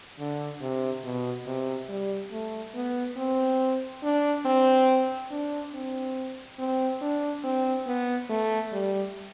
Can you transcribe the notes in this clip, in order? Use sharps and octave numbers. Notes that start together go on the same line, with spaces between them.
D3
C3
B2
C3
G3
A3
B3
C4
D4
C4
D4
C4
C4
D4
C4
B3
A3
G3